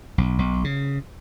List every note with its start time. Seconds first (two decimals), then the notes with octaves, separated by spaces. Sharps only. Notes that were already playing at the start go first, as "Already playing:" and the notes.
0.18 B1
0.39 B1
0.64 C#3